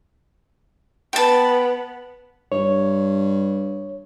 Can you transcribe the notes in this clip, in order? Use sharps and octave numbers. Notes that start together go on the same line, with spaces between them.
B3 G5 A5
G2 C#5